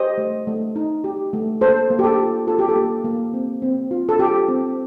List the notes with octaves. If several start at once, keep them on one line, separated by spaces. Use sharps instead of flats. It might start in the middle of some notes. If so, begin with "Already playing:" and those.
Already playing: G4 C5 D#5
A3
A3
D#4
G4
A3
A#3 A4 C5
A#3
G4
A4
F4
F4 A4
G4
A4
A#3
A#3
C4
C4
F4
A4
F4 G4
C4